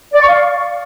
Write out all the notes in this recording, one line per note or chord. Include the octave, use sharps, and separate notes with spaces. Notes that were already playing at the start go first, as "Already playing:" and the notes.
D5
C#6
F5